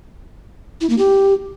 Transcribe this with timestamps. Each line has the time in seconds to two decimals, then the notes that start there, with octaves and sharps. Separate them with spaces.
0.81 E4
0.90 A#3
0.98 G4